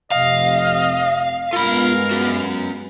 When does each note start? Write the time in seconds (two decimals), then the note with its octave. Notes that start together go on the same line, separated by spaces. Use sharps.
0.11 F1 C3 F3 D#5 F5
1.53 G2 G#3 B3 F4 A#4 B5
2.11 C#4 F#4